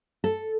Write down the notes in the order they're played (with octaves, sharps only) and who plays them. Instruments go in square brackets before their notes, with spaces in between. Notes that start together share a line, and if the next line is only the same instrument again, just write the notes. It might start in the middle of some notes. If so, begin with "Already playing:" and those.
[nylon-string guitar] A4